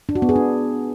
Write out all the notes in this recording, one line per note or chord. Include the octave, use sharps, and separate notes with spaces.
D4
F#4
B3
G#4
D4